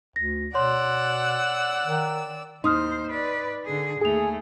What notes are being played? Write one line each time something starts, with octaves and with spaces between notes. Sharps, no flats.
D2 A#6
B2 C#5 D5 F#5 C6 E6
D#3
D#2 D#4 C5 C6 D#6 F6
B4 D5
D3 G#4
D#2 A3 G#4 G#5 F7